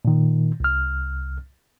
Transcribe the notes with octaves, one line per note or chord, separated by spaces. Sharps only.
A#2 D#3
C2 F6